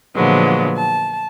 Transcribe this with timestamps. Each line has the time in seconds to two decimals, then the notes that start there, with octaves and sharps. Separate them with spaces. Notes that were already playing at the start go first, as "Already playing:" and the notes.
0.15 A#2 D3 F3 F#3 G#3 B3
0.75 A5